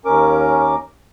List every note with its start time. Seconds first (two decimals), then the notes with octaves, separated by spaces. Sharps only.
0.05 D#2 C#4 A#4 D6